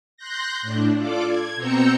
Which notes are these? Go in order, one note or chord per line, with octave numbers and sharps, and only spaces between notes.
C6 F#6 G6 A#6
A2 D4
F4 A4 D5 D6
G#6
B2 C4 A#5 E6 G6 C#7